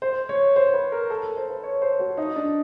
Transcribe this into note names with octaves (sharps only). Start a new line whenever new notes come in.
C5
C#5
C5
B4
A#4
A4
A#4
C5
B4
C#5
C5
F#4
D#4
D4